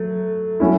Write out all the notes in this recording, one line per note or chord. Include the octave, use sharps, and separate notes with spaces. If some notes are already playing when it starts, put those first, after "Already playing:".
Already playing: F#3 A3
F#3 C#4 E4